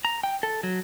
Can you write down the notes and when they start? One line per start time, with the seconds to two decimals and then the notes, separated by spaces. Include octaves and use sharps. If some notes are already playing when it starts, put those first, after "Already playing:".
0.05 A#5
0.24 G5
0.43 A4
0.63 F#3